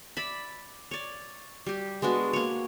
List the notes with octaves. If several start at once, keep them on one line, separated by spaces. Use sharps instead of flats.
D5 E5 B5
C#5 D5
G3 G4
G#3 B3 D4 F#4
A#3 C#5